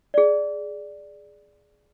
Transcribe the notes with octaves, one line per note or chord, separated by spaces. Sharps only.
G#4 D5